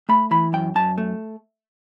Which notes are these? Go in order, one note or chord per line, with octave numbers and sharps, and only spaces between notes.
A3 B5
E3 B5
F#2 G5
F#2 A5
A3